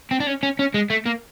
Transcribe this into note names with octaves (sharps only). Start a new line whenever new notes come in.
C4
D4
C#4
C#4
C#4
G#3
A3
A#3